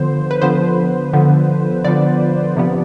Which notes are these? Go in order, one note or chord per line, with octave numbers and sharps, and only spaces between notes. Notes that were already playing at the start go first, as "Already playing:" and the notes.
Already playing: D3 F3 B3 C5
B4
D3 F3 B3 C5
D3 F3 B3
D3 F3 B3 D5
C3 F3 B3